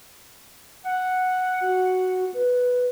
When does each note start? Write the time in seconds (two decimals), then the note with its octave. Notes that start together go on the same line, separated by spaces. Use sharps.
0.84 F#5
1.61 F#4
2.34 B4